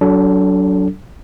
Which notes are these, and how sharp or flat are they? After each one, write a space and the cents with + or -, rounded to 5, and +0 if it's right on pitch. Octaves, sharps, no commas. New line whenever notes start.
F#3 +20 D4 -25 A4 +0